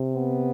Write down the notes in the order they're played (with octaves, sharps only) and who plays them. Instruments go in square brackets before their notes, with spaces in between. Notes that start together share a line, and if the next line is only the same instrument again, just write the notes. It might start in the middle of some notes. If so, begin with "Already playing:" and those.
Already playing: [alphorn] C3
[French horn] B3